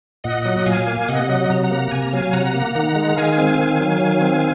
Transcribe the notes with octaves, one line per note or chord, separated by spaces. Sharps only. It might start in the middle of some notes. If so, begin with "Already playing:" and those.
A#2 D#5 F#5
F#3
A#2 F5 G#5
A#3
C3 D#5 F#5
F#3
C3 A#5
F#5 A#5
A#3
C3 G#5
A#5
F#3 F5 G#5
C3 F#5 A#5
A#3
D#3 F#5 A#5
G#3
D#3 F5 G#5
C4
D#3
F#3
D#3
C4